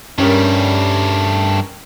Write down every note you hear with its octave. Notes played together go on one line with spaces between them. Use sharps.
G2 G3 A3 C#4 A#4